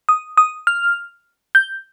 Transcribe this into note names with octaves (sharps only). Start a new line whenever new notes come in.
D#6
D#6
F6
G6